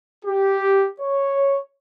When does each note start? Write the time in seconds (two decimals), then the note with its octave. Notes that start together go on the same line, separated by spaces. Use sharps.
0.24 G4
1.00 C#5